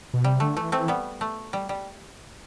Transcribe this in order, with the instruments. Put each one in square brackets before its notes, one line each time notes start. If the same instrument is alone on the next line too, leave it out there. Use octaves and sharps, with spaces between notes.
[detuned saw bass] B2
[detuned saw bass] C3 [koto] G3
[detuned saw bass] D3 [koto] A3
[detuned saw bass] E3 [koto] A3
[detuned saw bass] E3 [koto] A3 C4
[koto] G3 B3
A3
G3
G3